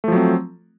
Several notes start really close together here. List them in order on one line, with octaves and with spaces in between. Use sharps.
A3 F3 F#3 C4